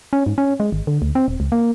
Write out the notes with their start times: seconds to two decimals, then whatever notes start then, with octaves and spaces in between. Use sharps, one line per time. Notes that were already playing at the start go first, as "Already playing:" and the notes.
0.13 C#4
0.26 G#2
0.38 C#4
0.60 G#3
0.72 G#1
0.87 D3
1.02 D2
1.15 C4
1.28 D#1
1.40 C#2
1.52 A#3